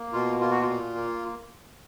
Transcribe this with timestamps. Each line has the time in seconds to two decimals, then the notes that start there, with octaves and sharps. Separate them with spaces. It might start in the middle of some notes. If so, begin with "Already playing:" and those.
Already playing: A#3
0.13 B2 F4
0.40 A#3 F4
0.51 F#4
0.61 F4
0.68 A#2
0.96 A#3